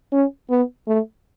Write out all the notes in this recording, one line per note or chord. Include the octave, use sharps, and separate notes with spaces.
C#4
B3
A3